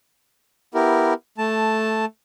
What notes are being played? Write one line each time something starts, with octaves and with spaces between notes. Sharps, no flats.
B3 E4 G4 A#4
A3 A5